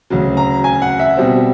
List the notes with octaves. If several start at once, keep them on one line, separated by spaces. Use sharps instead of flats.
D2 C#3 F#3
A#5
G#5
F#5
E5
B2 G3 C4